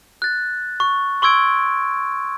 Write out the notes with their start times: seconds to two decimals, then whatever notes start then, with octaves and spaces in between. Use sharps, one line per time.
0.22 F#6 A6
0.80 C#6
1.22 C6 C#6 E6 G#6 D7